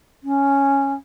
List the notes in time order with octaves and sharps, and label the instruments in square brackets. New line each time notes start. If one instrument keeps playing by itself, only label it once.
[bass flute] C#4